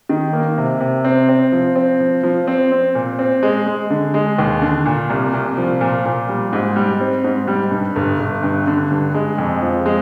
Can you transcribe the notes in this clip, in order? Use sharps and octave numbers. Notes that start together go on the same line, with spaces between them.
D#3
A#3
C3
C3
C4
C4
F3
C4
F3
F3
C4
C4
A#2
C4
G#3
G#3
D3
G#3
D#2
D3
A#2
C2
C2
F3
A#2
A#2
G3
G#2
G3
C4
G#2
G3
G2
G1
G1
G2
D3
G2
G#3
F2
F3
G#3